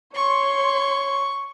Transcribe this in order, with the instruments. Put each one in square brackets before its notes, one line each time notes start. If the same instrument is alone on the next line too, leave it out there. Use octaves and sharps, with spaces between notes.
[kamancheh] C#5 C6 [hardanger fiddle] C#6